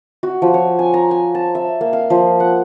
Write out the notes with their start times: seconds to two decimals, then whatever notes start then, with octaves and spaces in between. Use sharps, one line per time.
0.23 F#4
0.42 F3
0.54 C#5
0.79 G#5
0.94 A#5
1.11 G#5
1.35 A5
1.55 E5
1.81 A#3
1.93 F5
2.10 F3
2.40 F#5